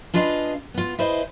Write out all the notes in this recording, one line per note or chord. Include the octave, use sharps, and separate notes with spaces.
D4 F4 G#4 B4 D#5 F5
B3 F4
E4 G#4 B4 C5 D#5